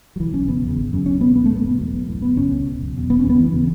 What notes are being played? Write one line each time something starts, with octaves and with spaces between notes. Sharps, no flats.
F#3
B1 E3
B2 C#4
F#1 B3
E2 C#3
G#1
F#2 C#3
C#2 C#4
B2 B3
A1 B3
A3
A2 B3
F#1 B3
E2 B2
B1
A2
F#1 B3
F#2 C#3 C#4
C#2
B2
F#1
E2 B2
E1 B3
C#4
D#2 C#3 B3
F#1 E3
C#3